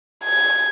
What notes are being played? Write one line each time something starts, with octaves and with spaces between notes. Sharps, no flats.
G#6